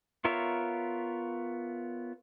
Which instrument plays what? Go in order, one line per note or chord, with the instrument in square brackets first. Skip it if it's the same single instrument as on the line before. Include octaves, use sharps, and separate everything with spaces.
[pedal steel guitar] B3 F4 A#4 C#5 E5